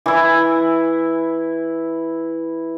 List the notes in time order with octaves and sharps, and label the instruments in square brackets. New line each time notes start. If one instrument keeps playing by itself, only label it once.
[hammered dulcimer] E3 E4